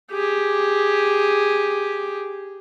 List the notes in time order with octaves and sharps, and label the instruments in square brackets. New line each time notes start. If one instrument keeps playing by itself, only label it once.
[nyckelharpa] G4 G#4